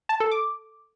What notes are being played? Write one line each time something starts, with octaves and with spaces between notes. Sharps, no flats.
A5
A4
D6